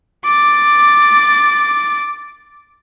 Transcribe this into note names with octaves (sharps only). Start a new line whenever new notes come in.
D6 A6